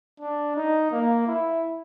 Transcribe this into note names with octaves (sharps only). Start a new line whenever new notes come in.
D4
D#4
A#3
E4